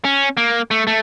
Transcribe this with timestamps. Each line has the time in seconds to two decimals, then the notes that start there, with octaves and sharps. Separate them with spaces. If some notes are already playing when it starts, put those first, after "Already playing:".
0.05 C#4
0.37 A#3
0.71 A3
0.87 A3